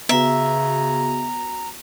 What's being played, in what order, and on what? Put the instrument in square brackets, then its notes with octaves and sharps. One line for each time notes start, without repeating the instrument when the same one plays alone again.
[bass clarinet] C#3 [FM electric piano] B3 F#4 [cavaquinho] E5 [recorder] A#5